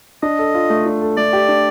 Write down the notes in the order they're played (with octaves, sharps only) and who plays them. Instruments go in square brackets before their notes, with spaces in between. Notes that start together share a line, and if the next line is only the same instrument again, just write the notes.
[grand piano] D4 [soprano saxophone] D#5
[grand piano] A4
F4
A3
D4
A4
[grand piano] A3 [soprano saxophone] D5
[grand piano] G4
D4